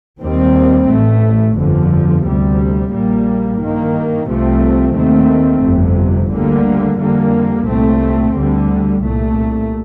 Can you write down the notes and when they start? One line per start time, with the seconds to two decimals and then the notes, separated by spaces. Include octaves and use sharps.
0.21 D#2 D#3 G3 C4
0.89 A1 A2 A3
1.56 G1 F2 D3 F3
2.24 D2 C3 G3
2.92 A#1 A#2 G3 A#3
3.60 G2 D#3 A#3
4.28 C2 C3 F3 A3 C4
4.96 D#2 D#3 A3 C4
5.63 G1 F2 C3
6.31 D2 D3 G3 A#3
6.98 F2 D3 G3 A#3
7.66 C2 A#2 A3 C4
8.34 D2 D3 G3
9.02 C2 A#2 A3